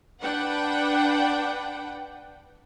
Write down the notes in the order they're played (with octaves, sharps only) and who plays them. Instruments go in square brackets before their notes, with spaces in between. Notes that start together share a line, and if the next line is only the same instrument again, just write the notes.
[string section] D4 B4 F#5 G5